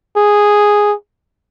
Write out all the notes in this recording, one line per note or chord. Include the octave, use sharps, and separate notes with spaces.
G#4